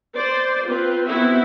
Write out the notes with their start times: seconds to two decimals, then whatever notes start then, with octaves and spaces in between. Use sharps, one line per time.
0.15 C5 D5
0.67 C4 F4 B4
1.07 B3 C4 E4 F#4 E5